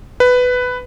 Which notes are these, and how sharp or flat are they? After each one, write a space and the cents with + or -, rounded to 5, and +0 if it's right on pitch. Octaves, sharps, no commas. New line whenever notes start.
B4 +10